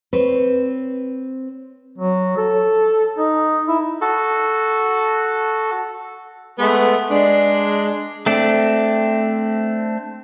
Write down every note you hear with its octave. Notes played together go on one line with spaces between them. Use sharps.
C4 B4 C#5
F#3
A4
D#4
E4
F#4 A4
G#3 A3 B3
G#3 D4
A3 C4 D4